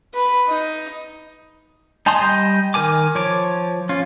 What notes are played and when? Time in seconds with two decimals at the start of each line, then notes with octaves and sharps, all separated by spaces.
0.14 B4
0.48 D#4
2.06 D#4 G#5 A5 C6 D#6
2.21 G3 D#5 G5
2.74 D#3 A#4 G#5 D6
3.15 F3 C#5 D6
3.89 C#4 F4